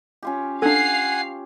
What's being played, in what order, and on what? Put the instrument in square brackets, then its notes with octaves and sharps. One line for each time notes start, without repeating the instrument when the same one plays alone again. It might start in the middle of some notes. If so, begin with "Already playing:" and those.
[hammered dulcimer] C#4 F4 G4
[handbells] D4 A4 [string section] F5 C7 [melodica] F#5 G#5